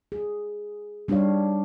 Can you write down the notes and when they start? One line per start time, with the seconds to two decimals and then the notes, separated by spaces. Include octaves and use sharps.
0.12 G#4
1.08 G3 D4 D#4 G4 C#5 F5